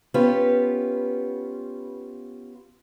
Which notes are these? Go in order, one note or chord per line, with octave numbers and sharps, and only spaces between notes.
B3 C#4 F4 G4 B4